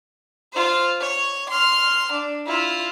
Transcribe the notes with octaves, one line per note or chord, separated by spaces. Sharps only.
F4 C5
C#5
C6 F6
D4
E4 F4